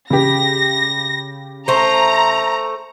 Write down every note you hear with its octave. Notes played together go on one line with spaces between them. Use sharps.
C#3 G4 A#6
A3 C5 A#5